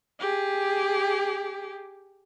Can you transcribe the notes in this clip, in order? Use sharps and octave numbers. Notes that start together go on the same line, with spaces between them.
G4 G#4